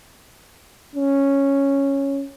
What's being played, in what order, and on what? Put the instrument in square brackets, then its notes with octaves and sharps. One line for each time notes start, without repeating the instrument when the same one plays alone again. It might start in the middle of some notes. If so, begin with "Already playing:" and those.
[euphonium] C#4